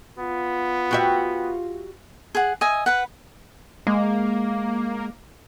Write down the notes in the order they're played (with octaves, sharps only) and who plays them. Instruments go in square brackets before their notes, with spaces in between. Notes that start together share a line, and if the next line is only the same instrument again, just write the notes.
[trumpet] B3 [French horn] F4
[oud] F#4 G4 E5
[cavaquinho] G#4 F#5
D#5 E5 G#5
B4 F#5
[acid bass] G#3 [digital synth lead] A#3